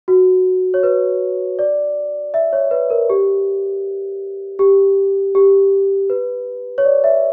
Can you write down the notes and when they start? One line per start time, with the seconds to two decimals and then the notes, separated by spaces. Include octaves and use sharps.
0.08 F#4
0.74 C#5
0.83 B4
1.59 D5
2.34 E5
2.53 C#5
2.71 B4
2.90 A#4
3.10 G4
4.59 G4
5.35 G4
6.10 B4
6.78 C#5
6.85 D5
7.04 E5